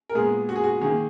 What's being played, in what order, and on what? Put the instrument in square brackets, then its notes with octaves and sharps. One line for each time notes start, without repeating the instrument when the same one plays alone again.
[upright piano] A#4
A#2 G#3 B3 G#4
F#4
G#4
F#4
D#3 A#3 G#4